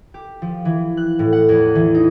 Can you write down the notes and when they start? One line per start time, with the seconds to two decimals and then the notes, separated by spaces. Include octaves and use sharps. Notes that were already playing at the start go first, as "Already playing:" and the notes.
0.14 G4
0.42 F3
0.65 E3
0.97 F#6
1.19 A2
1.32 F#5
1.49 E2
1.75 E3
1.94 D#4